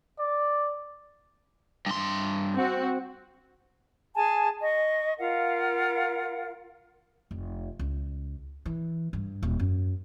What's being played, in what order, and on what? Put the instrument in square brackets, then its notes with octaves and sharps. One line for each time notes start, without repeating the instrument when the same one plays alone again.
[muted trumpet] D5
[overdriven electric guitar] G2 C6
[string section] C4 F#4
[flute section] G#4 G#5 A5
D#5 C#6
F4 A#4 F5 F#5
[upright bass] F1
C#2
E3
G2
D#1
F#2